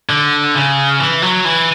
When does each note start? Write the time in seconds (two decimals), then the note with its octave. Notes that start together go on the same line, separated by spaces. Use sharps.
0.09 D3
0.55 C#3
0.99 E3
1.22 F#3
1.45 E3